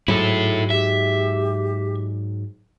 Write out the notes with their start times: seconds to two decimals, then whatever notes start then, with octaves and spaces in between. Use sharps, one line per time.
0.08 G#2 F#3 G#3 E4 A4
0.70 G4 E5